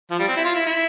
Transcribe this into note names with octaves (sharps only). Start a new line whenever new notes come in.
F3
G3
C4
E4
F4
E4
E4